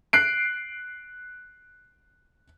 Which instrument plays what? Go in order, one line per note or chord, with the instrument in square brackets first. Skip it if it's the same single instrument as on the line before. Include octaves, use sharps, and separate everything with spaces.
[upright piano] F#6 C7 D7